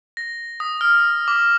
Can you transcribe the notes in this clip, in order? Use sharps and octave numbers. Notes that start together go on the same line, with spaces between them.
A#6
D#6
F6
D6